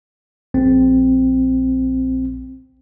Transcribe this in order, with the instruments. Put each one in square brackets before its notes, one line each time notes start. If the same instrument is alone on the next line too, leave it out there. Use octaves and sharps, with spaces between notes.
[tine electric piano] A#1 C4